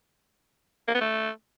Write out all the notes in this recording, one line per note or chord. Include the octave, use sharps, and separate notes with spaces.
A#3
B3
A3